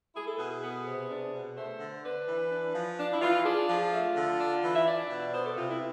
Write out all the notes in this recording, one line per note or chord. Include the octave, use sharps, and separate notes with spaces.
E4 G#4
A4
B2 G#4
G#4
B3
C3
D4
B2
A3 C5
D3
D4 B4
E3
D4
F3
D4
E4
E3 F4
D4 G#4
F3 F4
A3
D3
D4
E3
E5
D4 D5
B2
B3 C5
A4
C3 F4
E4